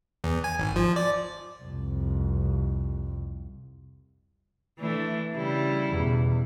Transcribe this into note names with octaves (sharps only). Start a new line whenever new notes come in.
E2
G#5
G#1
F3
D5
C2 F2
E3 A3 D4
C#3 G3 E4
E2 B2